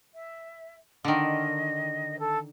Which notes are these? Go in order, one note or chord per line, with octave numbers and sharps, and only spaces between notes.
E5
D3 D#3 D#5
A4